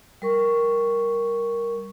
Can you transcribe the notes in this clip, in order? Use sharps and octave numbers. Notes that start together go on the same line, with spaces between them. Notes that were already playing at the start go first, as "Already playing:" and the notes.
G3 A#4 C#6